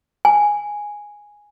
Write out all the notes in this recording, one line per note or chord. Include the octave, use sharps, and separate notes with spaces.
G#5